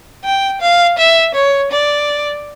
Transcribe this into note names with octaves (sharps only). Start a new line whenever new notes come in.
G5
F5
E5
C#5
D5